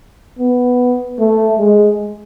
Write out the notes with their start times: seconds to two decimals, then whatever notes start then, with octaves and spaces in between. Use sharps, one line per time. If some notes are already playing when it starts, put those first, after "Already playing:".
0.39 B3
1.19 A3
1.59 G#3